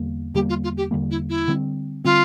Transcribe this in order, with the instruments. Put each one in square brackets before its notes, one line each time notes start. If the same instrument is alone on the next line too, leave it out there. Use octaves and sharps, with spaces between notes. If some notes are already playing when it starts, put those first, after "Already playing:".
Already playing: [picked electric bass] E2 D3 G3 A#3
[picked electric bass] E2 D3 G3 A#3 [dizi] G4
[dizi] F4
F4
G4
[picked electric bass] E2 D3 G3 A#3
[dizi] E4
E4
[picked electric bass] D3 G3 C4
[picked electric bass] D3 G3 C4 [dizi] F4